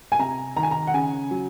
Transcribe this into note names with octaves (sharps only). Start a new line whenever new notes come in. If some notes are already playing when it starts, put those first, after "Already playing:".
G#5
C3 A#5
D#3 A#5
G#5
A#5
F#5
C#3 G#5
F#3